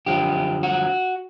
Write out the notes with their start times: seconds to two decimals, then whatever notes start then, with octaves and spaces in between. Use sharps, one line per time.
0.06 F#2 D3 F3 G4
0.63 F#4